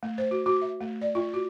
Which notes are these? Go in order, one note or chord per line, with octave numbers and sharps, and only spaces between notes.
A3
C5
F#4
F#4
E5
A3
D5
F4
F#4